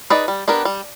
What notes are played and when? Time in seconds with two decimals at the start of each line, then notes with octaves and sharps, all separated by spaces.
0.10 D#4 G#4 B4 D5
0.28 G3
0.48 B3 D4 G4 A#4
0.65 G3